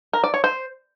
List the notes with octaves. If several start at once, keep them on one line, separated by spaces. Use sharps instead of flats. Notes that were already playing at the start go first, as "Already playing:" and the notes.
A#4
D5
C#5
C5